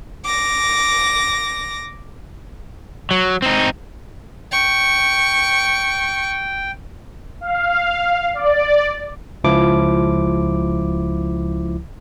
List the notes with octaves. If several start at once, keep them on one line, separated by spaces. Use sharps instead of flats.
D6 A#6
F#3
C4 D#4
G5 C#6
F5
D5
C#2 F3 E4 D6